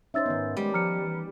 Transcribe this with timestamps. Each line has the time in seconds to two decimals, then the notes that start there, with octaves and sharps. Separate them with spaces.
0.14 C#4 D#4 C5 E5 E6 A6
0.26 G#2 D#3 B3
0.57 G3 G#3
0.73 F3 A#5 F6 C#7
1.01 E3